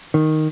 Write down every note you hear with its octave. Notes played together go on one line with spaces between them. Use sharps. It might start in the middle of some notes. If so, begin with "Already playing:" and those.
D#3